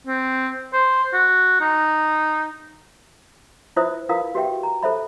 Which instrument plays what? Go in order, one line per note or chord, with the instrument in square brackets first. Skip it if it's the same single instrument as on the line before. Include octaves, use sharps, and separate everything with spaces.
[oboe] C4
C5
F#4
D#4
[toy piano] E4 F4 B4 C5 E5 D#6
E4 F4 A#4 B4 F5 D#6
F#4 G4 B4 E5 G5
A#5
A4 C5 E5 B5